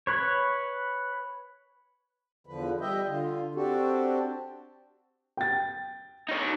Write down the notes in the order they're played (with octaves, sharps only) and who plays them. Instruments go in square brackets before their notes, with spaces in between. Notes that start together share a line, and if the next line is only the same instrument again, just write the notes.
[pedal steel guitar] B4 C#5
[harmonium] E2 D3 F3 B4
G3 G4 D#5 E5 G5
D3 F4
C4 D4 F#4 G4 A4
[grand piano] G5 A6
[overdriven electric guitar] D#4 C#5